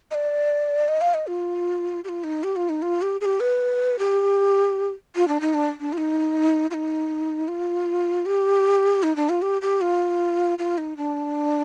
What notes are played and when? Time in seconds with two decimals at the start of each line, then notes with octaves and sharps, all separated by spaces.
0.11 D#5
0.14 D5
0.88 D#5
1.01 F5
1.14 D#5
1.27 F4
2.04 G4
2.09 F4
2.24 D#4
2.44 G4
2.56 F4
2.69 D#4
2.82 F4
3.02 G4
3.21 G#4
3.25 G4
3.40 B4
3.99 G4
5.16 F4
5.28 D4
5.41 D#4
5.54 D4
5.80 D4
5.93 F4
5.98 D#4
6.71 F4
6.74 D#4
7.48 F4
8.26 G4
9.03 D#4
9.16 D4
9.29 F4
9.42 G4
9.62 G4
9.81 F4
10.59 F4
10.78 D#4
10.97 D4